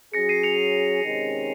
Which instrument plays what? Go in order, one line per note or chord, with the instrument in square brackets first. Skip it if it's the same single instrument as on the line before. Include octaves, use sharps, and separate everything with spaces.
[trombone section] F#3 C#4 G#4 [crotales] A#6 C#7
[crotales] C7 D#7
C#7 F7
[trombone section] C3 D#3 G#3 C#4